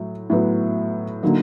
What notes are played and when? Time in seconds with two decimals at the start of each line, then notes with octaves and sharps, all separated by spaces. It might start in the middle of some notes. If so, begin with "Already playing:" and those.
Already playing: A2 F#3
0.30 A2 F#3 B3
1.23 D3 F#3 A#3 D#4